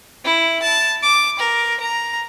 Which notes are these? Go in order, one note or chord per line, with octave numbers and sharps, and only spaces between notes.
E4
A5
D6
A#4
A#5